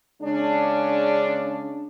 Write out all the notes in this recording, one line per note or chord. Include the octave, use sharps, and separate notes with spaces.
C#3 G#3 C#4 D4